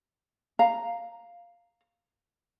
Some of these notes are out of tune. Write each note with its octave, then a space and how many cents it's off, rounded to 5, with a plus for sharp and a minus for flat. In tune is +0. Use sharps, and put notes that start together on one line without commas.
F5 +0 A#5 +0